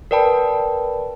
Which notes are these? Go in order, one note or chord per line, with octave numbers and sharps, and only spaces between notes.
A#4 B4 D5 G5 A5 B5